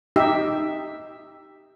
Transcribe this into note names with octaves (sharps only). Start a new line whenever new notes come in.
D#4 G4 E5